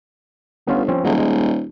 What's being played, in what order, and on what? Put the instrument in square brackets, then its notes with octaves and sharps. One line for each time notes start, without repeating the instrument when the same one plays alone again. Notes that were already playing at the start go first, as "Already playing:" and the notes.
[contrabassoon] G1 [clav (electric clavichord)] B3 C#4 F4
[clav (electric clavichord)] F3 C4 C#4
[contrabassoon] D#1 [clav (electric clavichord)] F#3 G#3 A3
[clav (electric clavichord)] G#3